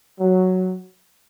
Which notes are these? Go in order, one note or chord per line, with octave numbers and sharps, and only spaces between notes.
F#3